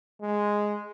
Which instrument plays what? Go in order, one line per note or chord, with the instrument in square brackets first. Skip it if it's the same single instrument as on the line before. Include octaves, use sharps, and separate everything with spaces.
[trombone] G#3